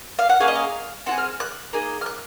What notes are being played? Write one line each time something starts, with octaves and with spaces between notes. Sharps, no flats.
F5
F#5
A#3 C#4 G#4 F5
D#5
F5
C4 F4 G#4 F#5
F6
F#6
A#3 D#4 G#4
F6
F#6